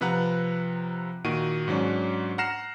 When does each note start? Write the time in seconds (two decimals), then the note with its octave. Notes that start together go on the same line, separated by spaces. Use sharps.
0.01 C3 F3 B4 F#5 A#5 F#6
1.25 A#2 D#3 F#4 D7 D#7
1.68 G#2 F#3 C#4 D4
2.38 F#5 A#5 F6 A#6 C7 E7